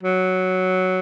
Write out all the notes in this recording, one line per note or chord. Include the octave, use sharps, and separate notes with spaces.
F#3